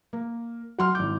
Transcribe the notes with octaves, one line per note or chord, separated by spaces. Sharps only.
A#3
F#3 F#4 F#5 C6 F6
G#1 E4 D6 G6